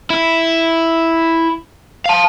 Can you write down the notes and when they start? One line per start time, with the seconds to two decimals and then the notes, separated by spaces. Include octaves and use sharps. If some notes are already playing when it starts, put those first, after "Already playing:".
0.10 E4
2.06 F5 A5